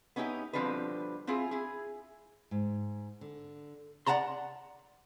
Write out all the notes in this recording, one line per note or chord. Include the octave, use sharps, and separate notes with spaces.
B3 C#4 D#4 E4 G4
B2 D3 F3 G3 C4 B4
C4 E4 F4 G#4
E4 G#4
G#2
D3
D5 E5 F#5 A5 A#5 C6